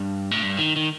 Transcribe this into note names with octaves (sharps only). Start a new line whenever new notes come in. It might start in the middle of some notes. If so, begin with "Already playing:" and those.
Already playing: G2
A2
G2
D#3
D#3